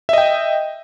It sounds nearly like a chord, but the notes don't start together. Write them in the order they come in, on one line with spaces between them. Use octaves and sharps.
E5 D#5 G5